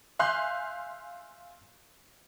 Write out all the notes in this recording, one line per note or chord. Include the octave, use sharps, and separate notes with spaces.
E5 F5 G#5 C6 F#6 G6